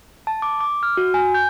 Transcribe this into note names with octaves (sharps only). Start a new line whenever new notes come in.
A5
D6
D6
F6
F#4
G#5
G6